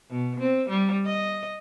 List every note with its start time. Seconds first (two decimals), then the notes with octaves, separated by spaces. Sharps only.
0.10 B2
0.40 C4
0.69 G3
1.05 D#5